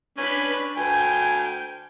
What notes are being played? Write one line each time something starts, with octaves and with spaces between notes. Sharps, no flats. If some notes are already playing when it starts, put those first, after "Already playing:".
C#4 D4 B4
D2 G5 G#5